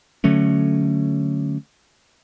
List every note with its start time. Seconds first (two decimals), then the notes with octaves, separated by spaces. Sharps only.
0.24 D3 F#3 A3 C#4